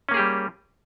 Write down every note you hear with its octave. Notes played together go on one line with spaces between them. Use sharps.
G3 A#3 C#4 G4 G#4